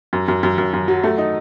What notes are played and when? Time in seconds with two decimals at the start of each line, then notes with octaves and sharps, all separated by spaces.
0.13 F#2
0.28 F#2
0.43 F#2
0.58 F#2
0.74 F#2
0.88 F#3
1.04 A3
1.18 D#4